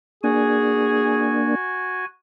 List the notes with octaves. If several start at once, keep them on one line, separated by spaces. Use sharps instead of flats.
A#3 D4 F#4 G#4 G#5